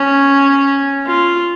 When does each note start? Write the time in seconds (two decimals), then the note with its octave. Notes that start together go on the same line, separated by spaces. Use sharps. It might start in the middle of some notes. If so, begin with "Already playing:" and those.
Already playing: C#4
1.07 F4